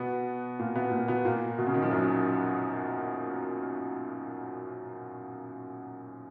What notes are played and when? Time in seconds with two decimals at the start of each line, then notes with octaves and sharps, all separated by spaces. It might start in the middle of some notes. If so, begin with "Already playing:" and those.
Already playing: B2 B3
0.59 A#2 A#3
0.76 B2 B3
0.91 A#2 A#3
1.08 B2 B3
1.25 A#2 A#3
1.58 B2
1.67 C#3
1.74 D#3
1.82 F3
1.90 F#2 F#3